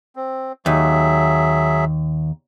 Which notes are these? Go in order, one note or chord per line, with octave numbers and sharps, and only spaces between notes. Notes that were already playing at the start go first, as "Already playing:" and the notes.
C4
D#2 F#3 G#4 E5